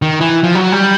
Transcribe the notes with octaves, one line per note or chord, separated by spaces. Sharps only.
D#3
E3
F3
F#3
G3